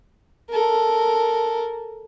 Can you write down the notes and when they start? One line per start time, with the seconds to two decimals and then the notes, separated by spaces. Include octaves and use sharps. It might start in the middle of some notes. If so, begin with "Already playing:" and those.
0.50 A4 A#4